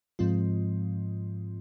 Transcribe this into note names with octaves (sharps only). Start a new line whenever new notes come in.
G#2 F3 G#3 C4 F4